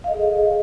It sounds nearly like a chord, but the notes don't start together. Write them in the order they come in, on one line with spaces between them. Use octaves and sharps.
F5 D#5 A4 G#4